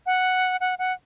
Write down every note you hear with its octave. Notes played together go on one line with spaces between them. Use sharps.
F#5
F#5
F#5